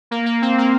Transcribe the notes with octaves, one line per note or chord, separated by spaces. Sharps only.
A#3
A#3
C4
A#3